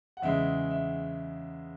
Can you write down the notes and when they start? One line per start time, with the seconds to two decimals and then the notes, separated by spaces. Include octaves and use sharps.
0.17 F#5
0.22 E2 C#3 G#3 E5
0.71 E5